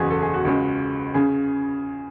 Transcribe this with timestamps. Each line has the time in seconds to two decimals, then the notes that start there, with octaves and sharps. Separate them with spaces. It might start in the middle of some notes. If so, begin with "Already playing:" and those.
Already playing: F#1 E2 B2 F#4 G#4
0.10 A4
0.22 G#4
0.34 F#4
0.45 C#2 C#3 G#3
1.14 C#3 G#4